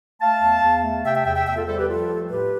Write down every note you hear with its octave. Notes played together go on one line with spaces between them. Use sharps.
A3 F5 A5
E2
E2
A3
C3 E5 G5
E5 G5
E2 E5 G5
E5 G5
E2 E5 G5
F4 A4
G3 A4 C5
G4 B4
F3 F4 A4
A3
A2 G4 B4